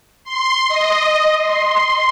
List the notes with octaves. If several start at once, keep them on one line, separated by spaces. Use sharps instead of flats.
C6
D#5
C6